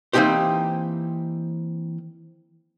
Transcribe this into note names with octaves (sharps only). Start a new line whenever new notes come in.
E3 A#3 C4 D#4 G4 C5